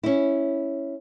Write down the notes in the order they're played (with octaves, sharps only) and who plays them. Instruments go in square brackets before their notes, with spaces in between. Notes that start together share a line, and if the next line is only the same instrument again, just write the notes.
[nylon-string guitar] C#4 E4